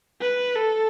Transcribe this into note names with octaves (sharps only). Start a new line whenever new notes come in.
B4
A4